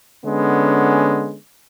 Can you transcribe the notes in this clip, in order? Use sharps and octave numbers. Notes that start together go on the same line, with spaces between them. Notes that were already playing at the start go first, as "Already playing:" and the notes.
D3 G#3 B3 C#4